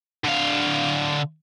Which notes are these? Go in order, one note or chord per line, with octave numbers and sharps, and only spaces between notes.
D3 F5